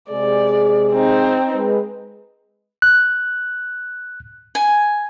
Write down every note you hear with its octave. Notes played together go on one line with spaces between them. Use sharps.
C3 G#3 G#4 D5
C4 D#4
G#3 B4
F#6
G#5